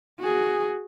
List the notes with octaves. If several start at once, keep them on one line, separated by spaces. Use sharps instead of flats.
F#4 G#4